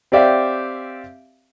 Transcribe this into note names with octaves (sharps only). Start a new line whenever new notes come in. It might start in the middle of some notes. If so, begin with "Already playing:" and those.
C4 G4 D5 E5 F5